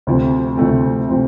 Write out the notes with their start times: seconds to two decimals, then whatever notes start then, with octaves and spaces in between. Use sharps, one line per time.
0.07 D2 C3 F3 A3 C4
0.57 D2 C3 F3 A3 C4
1.08 C3 F3 A3 C4